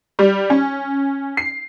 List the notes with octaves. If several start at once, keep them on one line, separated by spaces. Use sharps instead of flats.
G3
C#4
C7